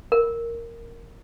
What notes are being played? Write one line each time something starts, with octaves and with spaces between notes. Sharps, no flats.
A#4